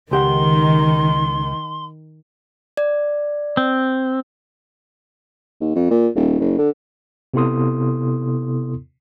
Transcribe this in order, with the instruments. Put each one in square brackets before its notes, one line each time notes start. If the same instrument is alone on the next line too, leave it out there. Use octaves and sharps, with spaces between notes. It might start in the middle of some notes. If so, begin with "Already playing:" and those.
[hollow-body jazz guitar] C#2 G4 F#5 [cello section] D#3 [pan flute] C6
[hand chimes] D5
[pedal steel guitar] C4
[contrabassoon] D#2
F2
A#2
D#1
F#1
D3
[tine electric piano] C3 B3 E4 A4 C6 D#6